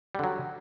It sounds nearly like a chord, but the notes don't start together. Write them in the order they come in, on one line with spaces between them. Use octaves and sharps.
G3 D3 F#3